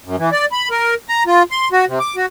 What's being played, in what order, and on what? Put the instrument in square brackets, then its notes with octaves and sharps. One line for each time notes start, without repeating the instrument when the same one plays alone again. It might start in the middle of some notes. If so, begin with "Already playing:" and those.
[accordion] F#2
E3
D5
B5
A#4
A#5
F4
C6
F#4
C3
D6
F#4